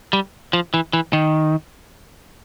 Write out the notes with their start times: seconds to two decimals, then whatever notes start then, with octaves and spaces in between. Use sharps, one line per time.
0.13 G3
0.53 F3
0.74 E3
0.93 E3
1.13 D#3